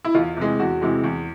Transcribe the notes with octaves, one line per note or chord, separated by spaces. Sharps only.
E4
E2 F4
C3 E3 G#3
E2 F#4
C3 E3 G#3
E2